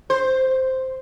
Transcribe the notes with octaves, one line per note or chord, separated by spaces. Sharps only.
C5